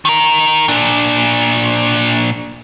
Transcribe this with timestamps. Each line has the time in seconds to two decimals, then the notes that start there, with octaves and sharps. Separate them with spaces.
0.05 D#3 A#4
0.68 A#2 D4